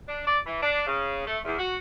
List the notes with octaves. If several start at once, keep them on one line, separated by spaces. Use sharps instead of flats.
D4
D5
E3
D4
C#3
A3
E2
F#4